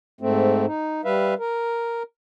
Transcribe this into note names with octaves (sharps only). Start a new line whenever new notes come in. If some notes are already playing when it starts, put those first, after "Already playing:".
G#2 A3 C4
D#4
G3 B4 E5 F5
A#4